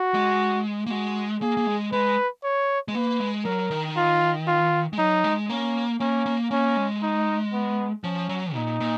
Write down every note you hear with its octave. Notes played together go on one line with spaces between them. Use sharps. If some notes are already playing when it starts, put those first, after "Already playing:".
Already playing: F#4
G#3
A#3
G#3 F#4
A#3 G#4
A#3
G#3
G#3 B4
C#5
G#3
A#3 B4
G#3
F#3 A#4
D#3
F4
F4
G#3
F#3 D#4
G#3
A#3 C#4
A#3 C#4
A#3
A#3 C#4
G#3
D#4
B3
F3 C#4
F#3
A#2 D#4
A#2